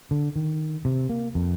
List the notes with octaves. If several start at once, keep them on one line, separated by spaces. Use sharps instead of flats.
D3
D#3
C3
A#3
F2